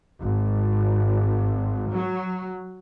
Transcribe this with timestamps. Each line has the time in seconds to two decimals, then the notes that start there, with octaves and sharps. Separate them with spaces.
0.18 G#1
1.89 F#3